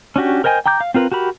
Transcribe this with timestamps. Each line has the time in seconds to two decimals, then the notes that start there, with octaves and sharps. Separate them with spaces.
0.16 C#4 D4 F#4 G4
0.44 A#4 C5 D#5 G5 G#5
0.66 G5 A#5 D6 G6
0.81 F5
0.94 C4 F4 A#4 B4
1.12 F#4 G4 A#4 B5